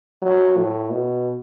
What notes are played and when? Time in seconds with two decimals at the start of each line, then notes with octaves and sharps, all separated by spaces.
0.22 F#3
0.57 A2
0.92 B2